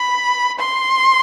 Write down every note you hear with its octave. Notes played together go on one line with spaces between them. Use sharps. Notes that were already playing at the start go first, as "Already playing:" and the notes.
Already playing: B5
C6